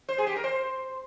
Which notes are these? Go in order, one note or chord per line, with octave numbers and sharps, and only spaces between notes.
C5
G#4
G4
A#4
C5